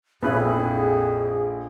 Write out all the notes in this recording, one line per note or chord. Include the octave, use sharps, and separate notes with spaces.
A#1 F2 C#4 E4 G#4 B4